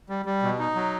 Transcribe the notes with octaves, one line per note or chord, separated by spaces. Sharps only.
G3
G3
B2
D#4
F#3